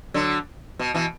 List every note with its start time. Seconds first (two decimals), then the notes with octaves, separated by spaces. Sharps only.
0.14 D3 F#3
0.79 B2
0.94 B2 E3